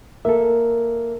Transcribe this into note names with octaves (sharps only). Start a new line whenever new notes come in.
A#3 A4 E5